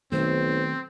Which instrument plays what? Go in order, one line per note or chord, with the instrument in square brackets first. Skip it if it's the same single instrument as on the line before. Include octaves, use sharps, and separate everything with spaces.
[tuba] B1 [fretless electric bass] D#3 A3 [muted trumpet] C4 [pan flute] C5